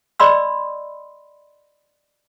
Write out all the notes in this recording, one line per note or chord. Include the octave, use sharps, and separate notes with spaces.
D5 D#5 B5 C6 E6